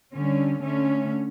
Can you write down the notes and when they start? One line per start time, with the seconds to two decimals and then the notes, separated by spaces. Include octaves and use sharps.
0.13 D3 G3 C#4
0.61 D3 A3 C#4